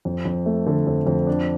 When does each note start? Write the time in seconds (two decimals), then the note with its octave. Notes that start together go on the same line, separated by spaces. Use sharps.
0.05 F2
0.25 F2
0.46 A3
0.66 D3
0.87 F2
1.07 F2
1.27 D4